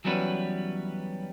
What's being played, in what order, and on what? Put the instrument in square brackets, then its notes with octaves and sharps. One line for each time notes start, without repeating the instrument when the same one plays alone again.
[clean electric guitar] E3 F#3 G3 B3 C#4 B4